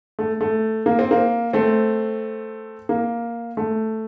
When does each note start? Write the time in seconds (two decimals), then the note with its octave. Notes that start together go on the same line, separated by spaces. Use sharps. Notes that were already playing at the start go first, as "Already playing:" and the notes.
0.19 A3
0.41 A3
0.86 A#3
0.99 C4
1.11 A#3
1.53 A3 C4
2.89 A#3
3.57 A3